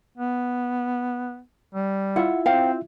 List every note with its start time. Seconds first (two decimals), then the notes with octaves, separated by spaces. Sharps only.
0.18 B3
1.75 G3
2.16 E4 F4 E5 F#5
2.46 C4 C5 F5 G5